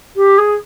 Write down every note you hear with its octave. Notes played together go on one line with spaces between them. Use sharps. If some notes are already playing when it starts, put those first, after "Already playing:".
G4
G#4